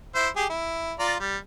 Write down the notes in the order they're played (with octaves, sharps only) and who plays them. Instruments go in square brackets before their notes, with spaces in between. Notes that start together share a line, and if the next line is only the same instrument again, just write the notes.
[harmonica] E4 C5 E5
G4 G#4
E4
F4 D5 A#5
G3